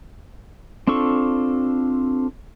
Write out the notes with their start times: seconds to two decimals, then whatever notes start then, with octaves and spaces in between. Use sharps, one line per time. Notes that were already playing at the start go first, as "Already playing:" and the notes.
0.87 C4 D4 F4 A4 C#6